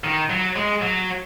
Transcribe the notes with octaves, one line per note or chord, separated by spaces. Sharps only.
D#3
F#3
G#3
F#3